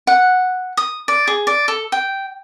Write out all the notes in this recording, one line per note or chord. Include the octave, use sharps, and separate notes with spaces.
F#5
D#6
D5
G#4
D5
A4
G5